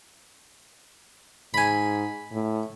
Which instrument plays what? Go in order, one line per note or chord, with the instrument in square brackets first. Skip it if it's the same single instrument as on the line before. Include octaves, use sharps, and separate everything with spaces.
[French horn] G#2 [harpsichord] G#5 B5
[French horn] A2